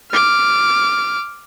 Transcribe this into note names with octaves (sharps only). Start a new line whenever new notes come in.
D6 F6